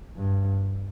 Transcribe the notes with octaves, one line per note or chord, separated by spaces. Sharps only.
G2